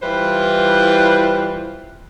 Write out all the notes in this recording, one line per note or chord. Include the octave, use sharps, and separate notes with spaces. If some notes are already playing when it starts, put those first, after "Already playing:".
E3 G3 E4 F4 B4 C5